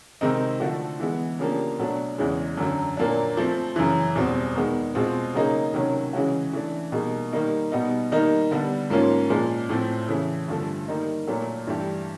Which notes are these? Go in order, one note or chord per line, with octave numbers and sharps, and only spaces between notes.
C3 D#3 G#3 C4 D#4
D3 F3 A3 D4 F#4
E3 G#3 B3
C#3 F3 A#3 D4 G4
B2 F#3 A3 D4
E2 C#3 E3 G#3
F#2 D3 F#3
A#2 F#3 A#3 D4
F3 A3 C4
F#2 C#3 E3
E2 B2 G3 C4
D#3 G#3 B3
B2 G#3 C4 F4 G#4
C#3 F#3 A#3 D#4 G#4
C3 D#3 F#3 A3 C#4
C#3 E3 G#3 C#4 F#4
E3 A3 D4
B2 G3 A#3 D#4 G#4
D#3 G3 A#3 D#4
B2 G3 B3 D#4
D#3 G3 A#3 D#4
D3 G3 B3 D4
G#2 F3 A#3 C#4 F4
A#2 F3 G#3
A2 F3 A3 C4
C#3 E3 A3
G2 D3 F3 A3
D#3 G3 A#3 D#4
A#2 F#3 A3
G2 E3 A3 D4 G4